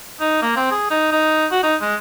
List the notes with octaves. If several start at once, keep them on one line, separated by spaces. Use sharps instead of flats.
D#4
A#3
C4
G#4
D#4
D#4
F#4
D#4
G#3